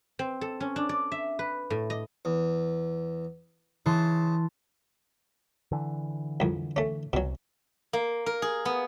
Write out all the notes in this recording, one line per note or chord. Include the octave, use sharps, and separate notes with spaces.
C4
A4
C#4
D4
D5
E5
B4
A2
D#5
E2
C#3 E3 A5 C6
D3 E3
C2 F2
A3 C#4
C2 B2 F#3
A#3
A#4
G#4
B3